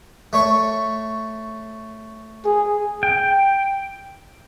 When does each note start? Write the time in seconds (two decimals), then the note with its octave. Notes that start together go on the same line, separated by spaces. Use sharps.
0.33 A3 C#5 C#6
2.45 G#4
3.03 G5